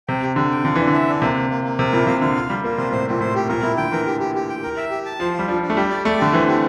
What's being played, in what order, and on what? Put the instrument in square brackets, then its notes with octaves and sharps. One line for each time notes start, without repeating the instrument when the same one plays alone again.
[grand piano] C3 [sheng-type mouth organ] G5
[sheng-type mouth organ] G4
[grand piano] D3 [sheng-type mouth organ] G4
[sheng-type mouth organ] G5
[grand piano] D3 [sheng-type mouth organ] F4
[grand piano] E3 [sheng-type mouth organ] D4
[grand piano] D3
[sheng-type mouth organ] E5
D4
[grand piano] C3 [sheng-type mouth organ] A#3
[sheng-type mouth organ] A#3
A#3
A#3
[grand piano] C3 [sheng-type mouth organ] A#4
[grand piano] A#2 [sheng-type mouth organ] E4
[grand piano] C3 [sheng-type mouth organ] F5
[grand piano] D3 [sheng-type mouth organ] F5
[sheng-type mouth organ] F4
[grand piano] G3 [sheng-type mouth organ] F4
[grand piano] A#3 [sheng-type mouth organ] F4
[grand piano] C3 [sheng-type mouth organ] C5
[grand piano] A2 [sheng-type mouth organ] C5
[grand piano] A#2 [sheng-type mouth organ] C4
[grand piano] A2 [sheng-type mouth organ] C5
[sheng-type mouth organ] G4
[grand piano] A#2 [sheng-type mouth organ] A#4
[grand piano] A#2 [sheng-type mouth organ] E4
[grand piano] D3 [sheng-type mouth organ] G5
[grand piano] E3 [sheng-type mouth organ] A#4
[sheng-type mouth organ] G4
G4
G4
G5
A#4
E5
G4
A5
[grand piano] F3 [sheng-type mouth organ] C5
[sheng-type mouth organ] F4
[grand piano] G3
[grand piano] F3 [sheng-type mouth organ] D4
[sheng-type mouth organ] D4
[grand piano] A3
[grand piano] G3 [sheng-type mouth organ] G4
[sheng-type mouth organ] D5
[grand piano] A3 [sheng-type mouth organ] D5
[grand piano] D3 [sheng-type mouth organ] G4
[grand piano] E3 [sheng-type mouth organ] C4
[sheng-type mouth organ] G4